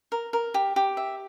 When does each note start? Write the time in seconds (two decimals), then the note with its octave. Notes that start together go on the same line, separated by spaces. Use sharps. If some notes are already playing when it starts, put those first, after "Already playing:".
0.12 A#4
0.33 A#4
0.54 G4
0.76 G4
0.97 E5